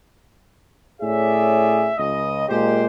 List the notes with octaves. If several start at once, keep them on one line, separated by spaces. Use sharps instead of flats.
A2 C#4 G#4 C#5 D5 E5
C#2 D#5
A#2 G#3 G4 C5